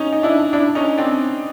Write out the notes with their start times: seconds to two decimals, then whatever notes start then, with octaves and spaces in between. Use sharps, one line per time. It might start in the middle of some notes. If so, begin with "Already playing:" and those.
Already playing: C#4 D#4
0.13 D#4
0.23 D4 E4
0.53 D4 E4
0.75 C#4 D#4
0.98 C4 D4